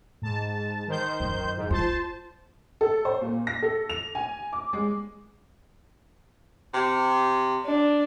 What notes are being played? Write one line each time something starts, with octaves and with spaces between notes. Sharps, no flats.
G#2 A5
D#3 C5 G6
F#2
G#2
F4 C5 A5
A4
C5
A#2
A#6
A4
F7
G#5
D6
G#3
C3
D4